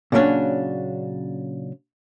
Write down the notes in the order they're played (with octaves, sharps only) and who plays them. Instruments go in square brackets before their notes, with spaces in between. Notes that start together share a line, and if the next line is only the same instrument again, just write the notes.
[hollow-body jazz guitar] A#2 C#3 F#3 A3 C#4 D4